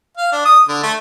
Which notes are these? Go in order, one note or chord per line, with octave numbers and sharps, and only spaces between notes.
F5
D4
D#6
D3
A3